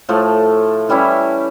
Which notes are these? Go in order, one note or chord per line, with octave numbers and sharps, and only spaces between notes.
A2 F3 A3
E3 G3 C#4 E4